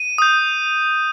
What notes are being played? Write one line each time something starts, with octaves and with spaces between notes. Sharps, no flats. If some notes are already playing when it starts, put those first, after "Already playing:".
Already playing: D#7
D#6 G6